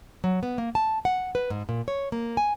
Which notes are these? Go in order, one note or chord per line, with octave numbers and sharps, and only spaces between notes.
F#3
B3
A#3
A5
F#5
B4
G#2
A#2
C#5
A#3
G#5